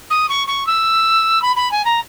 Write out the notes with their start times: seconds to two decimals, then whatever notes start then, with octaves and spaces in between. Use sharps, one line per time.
0.10 D#6
0.29 C#6
0.47 C#6
0.66 E6
1.42 B5
1.56 B5
1.71 G#5
1.85 A#5